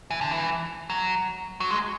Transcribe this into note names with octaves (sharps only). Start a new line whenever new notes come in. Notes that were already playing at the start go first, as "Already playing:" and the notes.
E3
D3
E3
F#3
F#3
G#3